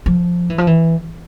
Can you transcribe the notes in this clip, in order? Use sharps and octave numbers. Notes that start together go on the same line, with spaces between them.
F3
E3
F3
E3